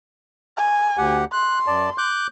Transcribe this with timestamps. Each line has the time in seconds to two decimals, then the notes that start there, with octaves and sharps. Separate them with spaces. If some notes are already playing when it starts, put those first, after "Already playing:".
0.57 G#5
0.98 D2 G4 F#5
1.32 C6 F#6
1.67 F#2 D5 A5
1.98 D6 F#6 G6